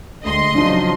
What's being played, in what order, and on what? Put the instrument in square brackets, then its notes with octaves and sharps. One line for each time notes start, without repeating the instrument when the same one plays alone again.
[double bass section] D2 G#3 [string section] D#5 C6
[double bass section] C#3 F3 F#3 [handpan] D4 D#4